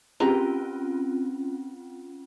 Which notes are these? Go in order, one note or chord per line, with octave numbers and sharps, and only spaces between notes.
C4 C#4 F4 G4 G#4 A#5